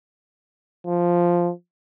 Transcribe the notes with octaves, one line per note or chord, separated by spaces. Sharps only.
F3